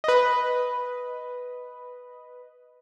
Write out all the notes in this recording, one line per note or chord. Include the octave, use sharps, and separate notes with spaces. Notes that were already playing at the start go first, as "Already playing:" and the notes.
B4 D#5